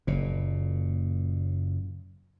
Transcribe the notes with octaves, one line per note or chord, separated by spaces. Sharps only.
F#1 A#2